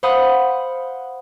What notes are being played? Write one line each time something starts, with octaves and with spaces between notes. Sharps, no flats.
C5 F5 F#5 B5 D#6 F#6